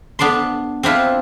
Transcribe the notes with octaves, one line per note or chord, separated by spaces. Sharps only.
B3 D4 D5 A5 C6
C4 D4 E4 F4